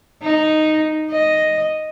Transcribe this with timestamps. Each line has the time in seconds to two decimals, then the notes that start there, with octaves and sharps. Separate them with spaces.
0.23 D#4
1.11 D#5